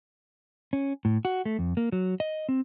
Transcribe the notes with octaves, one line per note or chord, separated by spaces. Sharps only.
C#4
A2
F#4
A3
F2
A#3
F#3
D#5
C4